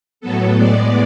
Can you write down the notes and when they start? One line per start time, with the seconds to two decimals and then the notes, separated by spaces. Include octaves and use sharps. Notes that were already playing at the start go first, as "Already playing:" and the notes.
0.21 A2 F#3 B3 A4
0.56 A2 G#3 B3 D5